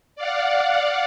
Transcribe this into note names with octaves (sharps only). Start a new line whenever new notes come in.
D5 F5 F#5